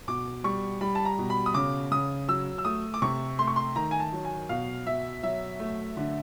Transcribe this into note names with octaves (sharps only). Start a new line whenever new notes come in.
B2 D6
G3 C#6
G3 B5
A5
A#5
B2
B5
D#6
C#3 D6
C#3 D#6
F#3 E6
E6
A3 D#6
D6
C3 C#6
A3 C6
C#6
C6
D#3 A#5
G#5
A5
F#3
G#5
B2 F5
B2 E5
F#3 E5
A3
D3